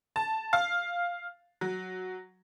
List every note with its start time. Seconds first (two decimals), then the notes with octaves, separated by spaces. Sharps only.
0.16 A5
0.53 F5
1.61 F#3